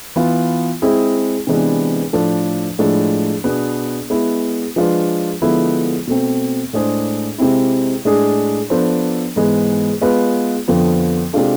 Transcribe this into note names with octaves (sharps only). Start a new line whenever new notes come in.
E3 B3 F4
G#3 C4 E4 G#4
C3 E3 G#3 B3 D4
A2 F3 A3 D4 A4
A2 F3 G#3 D4
B2 B3 D4 G#4 B4
G#3 B3 E4
F3 G#3 D4 F4 B4
D3 F3 G#3 B3 E4
B2 A3 C4
A2 G#3 D4 G#4 C5
C3 G#3 C4 E4
A2 G#3 D4 G#4
F3 B3 D4 A4 C5
G#2 E3 G#3 B3
G#3 B3 F4 B4
F2 D3 F3 B3
C3 G#3 D4 F4 A4